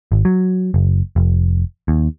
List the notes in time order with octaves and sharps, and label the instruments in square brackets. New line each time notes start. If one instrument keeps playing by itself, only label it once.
[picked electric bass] G#1
F#3
F#1
F1
D#2